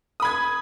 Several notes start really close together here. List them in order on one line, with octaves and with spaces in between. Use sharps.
D#6 B5 G#6